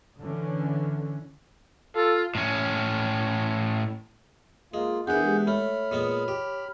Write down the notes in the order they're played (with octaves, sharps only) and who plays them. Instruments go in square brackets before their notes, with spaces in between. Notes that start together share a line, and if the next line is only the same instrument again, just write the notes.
[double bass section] D3 E3 C#4
[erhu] F4 [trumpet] A4
[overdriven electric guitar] A2 C#4
[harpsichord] G#3 [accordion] A#3 F4
[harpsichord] E2 E4 [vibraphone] D4 A#4 [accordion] G#4 F#5 G6
[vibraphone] G#3 G4
[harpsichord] A3 [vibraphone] C#5 [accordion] B5 F6
[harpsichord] A#2 G#3 B3
G4